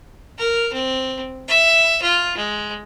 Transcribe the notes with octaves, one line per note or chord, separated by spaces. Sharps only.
A#4
C4
E5
F4
G#3